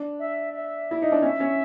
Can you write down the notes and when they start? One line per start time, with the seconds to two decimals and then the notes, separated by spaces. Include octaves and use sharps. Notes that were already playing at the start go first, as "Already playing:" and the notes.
Already playing: D4
0.19 E5
0.53 E5
0.91 E4
1.02 D#4
1.12 D4
1.22 C#4 E5
1.40 C#4